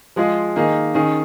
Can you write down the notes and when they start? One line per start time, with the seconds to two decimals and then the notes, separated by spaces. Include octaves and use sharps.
0.16 F3 G#3 F4 G#4
0.56 D#3 A#3 D#4 G#4
0.94 D#3 C#4 G#4